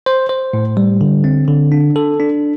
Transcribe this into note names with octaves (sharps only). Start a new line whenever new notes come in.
C5
C5
A2
G3
D3
C4
D3
D4
A4
D4